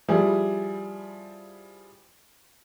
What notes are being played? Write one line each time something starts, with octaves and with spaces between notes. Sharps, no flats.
F3 G3 E4 G#4